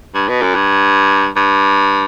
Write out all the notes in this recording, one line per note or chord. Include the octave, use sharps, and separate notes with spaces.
G2
B2
F#2
G2
G2